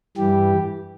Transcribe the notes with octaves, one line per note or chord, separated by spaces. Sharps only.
G2 E3 G3 G4